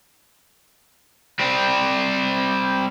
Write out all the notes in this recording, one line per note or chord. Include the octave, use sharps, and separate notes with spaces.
G3 C4